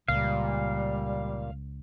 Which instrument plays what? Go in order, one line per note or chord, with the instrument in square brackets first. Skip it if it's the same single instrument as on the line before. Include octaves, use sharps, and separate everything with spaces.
[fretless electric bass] C#2 [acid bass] A#2 [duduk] G3 [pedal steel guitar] F5